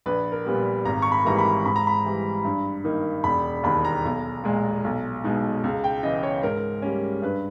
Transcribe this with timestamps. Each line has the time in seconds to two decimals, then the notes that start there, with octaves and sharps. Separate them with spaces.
0.06 A#1 B4
0.32 A#4
0.45 A#2 G3 B3
0.85 G#1 A#5
1.02 C#6
1.12 B5
1.25 G#2 E3 G3 A#3 A#5
1.38 B5
1.66 G#2 B5
1.76 A#5
1.87 B5
2.05 E3 G3
2.45 G2
2.84 D#3 A#3 D#4
3.24 E1 B5
3.64 D#2 D#3 B5
3.85 A#5
4.05 B1
4.44 A#2 G#3
4.84 B1
5.24 B2 G#3 D#4
5.64 C#2
5.84 G5
6.03 C#3 E3 D#5
6.23 C#5
6.43 G#2 A#4
6.82 G3 A#3 C#4
7.22 G2 B4